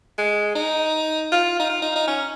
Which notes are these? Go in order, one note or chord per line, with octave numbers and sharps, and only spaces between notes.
G#3
D#4
F4
D#4
F4
D#4
D#4
C#4